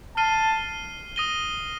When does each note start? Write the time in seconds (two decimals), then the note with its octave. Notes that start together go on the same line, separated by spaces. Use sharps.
0.17 A5 F6 C7 D#7 G7
1.16 D#6 A#6 D#7 G7